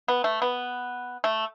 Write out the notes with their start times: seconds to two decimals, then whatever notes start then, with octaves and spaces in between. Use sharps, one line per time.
0.08 B3
0.24 A3
0.42 B3
1.24 A3